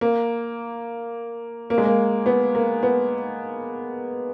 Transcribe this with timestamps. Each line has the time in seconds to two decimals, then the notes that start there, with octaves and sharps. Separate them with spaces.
0.01 A#3
1.70 A#3
1.78 G#3
1.85 A#3
2.26 B3
2.55 A#3
2.83 B3